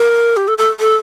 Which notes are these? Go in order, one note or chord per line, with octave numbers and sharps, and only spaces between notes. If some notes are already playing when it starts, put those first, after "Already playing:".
Already playing: A#4
G4
A4
A4
A4